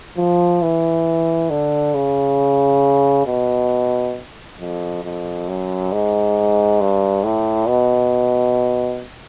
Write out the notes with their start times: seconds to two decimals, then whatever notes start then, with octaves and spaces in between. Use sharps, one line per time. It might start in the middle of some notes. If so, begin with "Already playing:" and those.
0.17 F3
0.62 E3
1.50 D3
1.94 C#3
3.26 B2
4.60 F2
5.03 F2
5.48 F#2
5.92 G#2
6.81 G2
7.24 A2
7.68 B2